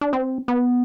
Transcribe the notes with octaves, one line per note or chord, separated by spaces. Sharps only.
D4
C4
B3